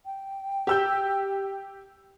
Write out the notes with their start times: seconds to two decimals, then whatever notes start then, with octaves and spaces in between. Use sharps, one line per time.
0.05 G5
0.67 G4 E6 G6